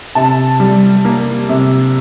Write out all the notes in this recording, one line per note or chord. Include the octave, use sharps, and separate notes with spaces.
C3 A5
G3
A#3
C3